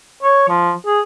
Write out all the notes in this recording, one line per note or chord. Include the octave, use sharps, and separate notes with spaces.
C#5
F3
G#4